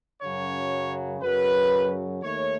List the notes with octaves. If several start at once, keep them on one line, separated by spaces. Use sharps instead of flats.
F#2 C#3 F#3 C#5
F#2 C#3 F#3 B4
D#2 D#3 A3 C#5